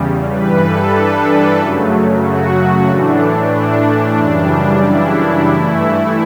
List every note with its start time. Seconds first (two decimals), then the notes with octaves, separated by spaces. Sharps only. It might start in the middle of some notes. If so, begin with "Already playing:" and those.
Already playing: E2 C#3 G3
0.30 G2 E3 G3 B4
0.62 A4
0.95 D4
1.59 F#2 C#3 F#3 A3
2.24 F#4
2.56 F#4
2.89 A2 E3 A3 D4
3.54 D4
4.19 F#2 C#3 E3 G3
4.84 E4
5.48 G2 E3 A3